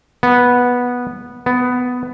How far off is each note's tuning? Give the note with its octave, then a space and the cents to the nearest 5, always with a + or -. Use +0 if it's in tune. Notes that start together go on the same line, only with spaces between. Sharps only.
B3 -10
B3 +10